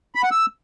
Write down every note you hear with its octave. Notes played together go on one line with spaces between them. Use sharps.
B5
F#5
E6